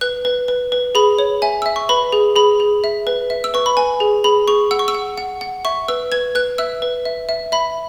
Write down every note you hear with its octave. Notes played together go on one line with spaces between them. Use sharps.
B4 F#6
B4
B4
B4
G#4 B5
C#5
E5 G#5
E5 E6
C#6
B4 B5
G#4
G#4 B5
G#4
E5
B4
E5
E6
B4 C#6
B5
B4 G#5
G#4
G#4 B5
G#4 C#6
F#5 E6
C#6
E6
F#5
F#5
F#5
E5 C#6
B4 E6
B4 G#6
B4 F#6
E5 E6
B4
E5
E5
E5 B5